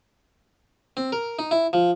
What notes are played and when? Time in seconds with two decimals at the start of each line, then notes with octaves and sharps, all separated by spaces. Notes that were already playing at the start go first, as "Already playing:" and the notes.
0.97 C4
1.12 A#4
1.39 D#4
1.51 E4
1.73 F3